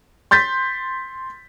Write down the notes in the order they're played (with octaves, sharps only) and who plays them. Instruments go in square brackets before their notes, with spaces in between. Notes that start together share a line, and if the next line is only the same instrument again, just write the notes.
[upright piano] C6 G6 A6 B6